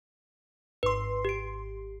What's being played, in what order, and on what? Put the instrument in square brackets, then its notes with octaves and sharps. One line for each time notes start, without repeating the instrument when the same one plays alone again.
[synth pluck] G#1 C6 [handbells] B4
[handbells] G4 D7